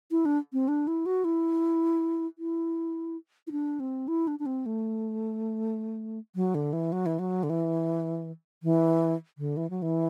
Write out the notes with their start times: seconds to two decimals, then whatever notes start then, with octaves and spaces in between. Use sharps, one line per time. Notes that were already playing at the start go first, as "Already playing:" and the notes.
0.11 E4
0.25 D4
0.53 C4
0.68 D4
0.87 E4
1.06 F#4
1.25 E4
2.39 E4
3.47 E4
3.52 D4
3.80 C4
4.08 E4
4.27 D4
4.39 D4
4.46 C4
4.66 A3
6.35 F#3
6.55 D3
6.73 E3
6.92 F#3
7.06 E3
7.19 F#3
7.43 D3
7.50 E3
8.63 E3
9.38 D3
9.57 E3
9.70 F#3
9.82 E3